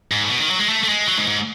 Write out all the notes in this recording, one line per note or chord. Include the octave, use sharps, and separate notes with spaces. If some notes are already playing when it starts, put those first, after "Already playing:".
G#2
A2
B2
D#3
F#3
G#3
A3
A3
G#3
F#3
G#2
G#2